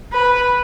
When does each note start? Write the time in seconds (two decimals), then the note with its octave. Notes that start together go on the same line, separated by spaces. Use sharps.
0.12 B4